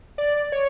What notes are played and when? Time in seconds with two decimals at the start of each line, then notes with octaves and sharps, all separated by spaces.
0.18 D5
0.52 C#5